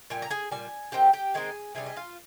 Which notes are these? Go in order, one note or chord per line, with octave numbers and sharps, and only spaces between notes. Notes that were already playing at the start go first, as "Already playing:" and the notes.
A#2 G3 G#5
A#5
G#4 G#5
A#2 G3 G#5
D#3 G#3 C4 G4 G5
G4 G5
D#3 G#3 C4 D#4 G#4 G#5
C3 G3 D4 G#4 G#5
D#5
F4 F5